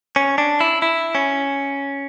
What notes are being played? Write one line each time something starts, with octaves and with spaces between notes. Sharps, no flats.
C#4
D4
E4
E4
C#4